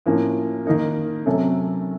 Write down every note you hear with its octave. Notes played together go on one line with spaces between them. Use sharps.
A2 F3 A#3 C#4
D#3 A#3 D#4 A#4
C3 F#3 A3 C#4 A4